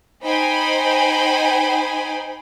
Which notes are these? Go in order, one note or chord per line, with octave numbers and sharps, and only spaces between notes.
D#4 C5 G5 G#5 B5